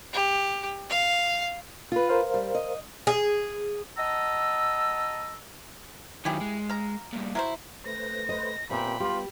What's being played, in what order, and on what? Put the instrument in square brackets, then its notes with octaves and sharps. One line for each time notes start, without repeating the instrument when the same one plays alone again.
[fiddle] G4
F5
[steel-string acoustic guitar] F4 B4
[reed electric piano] A#4 C5 F5
[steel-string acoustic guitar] G3
D#5
[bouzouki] G#4
[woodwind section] D#5 F#5 A5 A#5 E6
[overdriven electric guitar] D#3 F#3 [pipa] E4 G4 G#4
[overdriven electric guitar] G#3
[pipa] F5 A#5
[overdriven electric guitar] G2 A#2
[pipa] F#3 A#4 C5 [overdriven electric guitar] E4
[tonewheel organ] A3 B4 C5 [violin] A#6
[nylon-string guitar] D#5
[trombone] A#2 [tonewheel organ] B3 C4 G4 [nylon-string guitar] C5 E5 [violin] G5 B5
[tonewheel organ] G3 B3 [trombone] F4 [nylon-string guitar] G4